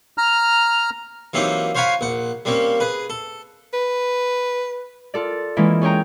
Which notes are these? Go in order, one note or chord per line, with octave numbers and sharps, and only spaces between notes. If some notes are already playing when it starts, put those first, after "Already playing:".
A#5 F6
E3 F#3 A#3 C4 D#4 G4
C5 C#5 F5 F#5 G#5 B5
A#1 F#5
G3 A#3 C4 C#4
G#4 B4
A4
B4
F4 A4 D5
E3 G#3 A#3 C#4 E4
C#4 G#4 C#5 G5 A#5